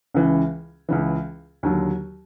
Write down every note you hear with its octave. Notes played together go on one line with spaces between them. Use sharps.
C#2 C#3 E3
C#2 C#3 E3
D#2 D3 F#3